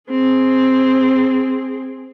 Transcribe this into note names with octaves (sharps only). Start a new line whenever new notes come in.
C4 G#4